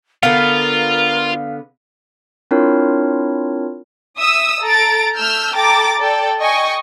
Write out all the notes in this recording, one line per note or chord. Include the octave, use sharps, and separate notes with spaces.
D3 B3 F4 A#4 F5
C4 D4 E4 F4 A#4 C#5
E5 D#6 E6
A4 A#5 A6 D7
A3 E6 F6 G6
A4 G5 A#5 D6 A6
A4 D5 G5
D#5 G5 G#5 C#6